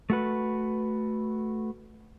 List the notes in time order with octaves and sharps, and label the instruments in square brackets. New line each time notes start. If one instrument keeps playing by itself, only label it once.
[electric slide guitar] A3 F#4 B4